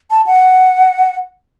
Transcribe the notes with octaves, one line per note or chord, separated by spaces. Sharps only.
A5
F#5